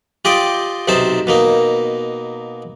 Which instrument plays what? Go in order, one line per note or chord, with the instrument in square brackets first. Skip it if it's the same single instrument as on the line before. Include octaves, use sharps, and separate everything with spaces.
[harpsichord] F4 G4 D5 D#5 G5
B1 C3 D#4 C5 A5
B2 A#3 D#4